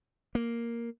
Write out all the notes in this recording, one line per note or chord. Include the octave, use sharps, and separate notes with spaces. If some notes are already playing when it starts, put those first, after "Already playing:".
A#3